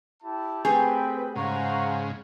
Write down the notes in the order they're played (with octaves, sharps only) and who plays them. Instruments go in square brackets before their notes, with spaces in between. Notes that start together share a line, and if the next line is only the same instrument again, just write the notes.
[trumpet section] E4 G4 A5
[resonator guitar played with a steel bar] A3 G4 G#4 [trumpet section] C4 G5 [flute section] B4
[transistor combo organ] G#2 C#3 [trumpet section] C5 F5 F#5 [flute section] A#5 C#6